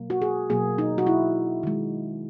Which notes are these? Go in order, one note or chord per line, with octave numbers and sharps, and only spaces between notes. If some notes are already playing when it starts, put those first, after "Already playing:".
Already playing: B2 F#3 A#3
F#4
G#4
B2 F#3 A#3 G#4
D#4
F#4
E4
D#3 G#3